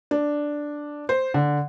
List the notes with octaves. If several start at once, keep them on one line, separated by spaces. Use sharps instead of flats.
D4
C5
D3